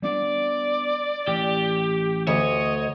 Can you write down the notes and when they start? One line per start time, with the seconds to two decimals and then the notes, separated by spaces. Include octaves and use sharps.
0.02 G3 B3 D4 D5
1.27 A1 G4
2.27 D2 C#5 D#5